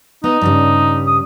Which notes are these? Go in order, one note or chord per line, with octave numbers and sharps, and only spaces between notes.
B3 D#4 D#5
G2 C#3 G3
D#6